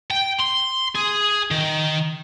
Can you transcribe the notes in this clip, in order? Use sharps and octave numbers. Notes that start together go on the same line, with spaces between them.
G5
C6
G#4
D#3